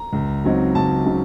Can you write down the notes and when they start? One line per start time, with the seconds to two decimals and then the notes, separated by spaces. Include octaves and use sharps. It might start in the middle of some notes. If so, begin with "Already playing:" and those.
Already playing: A#5
0.13 C#2
0.44 C#3 F#3 C4 D#4
0.75 C#2 A5
1.05 C#3 F#3 C4 D#4